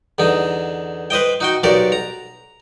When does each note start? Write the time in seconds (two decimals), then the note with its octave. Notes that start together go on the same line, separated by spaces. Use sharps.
0.18 E2 D3 D#4
1.10 B4 C5 D#5 G5
1.40 D#4 F#4 G5
1.63 B1 F#4 G4 A#4 D5
1.92 A#5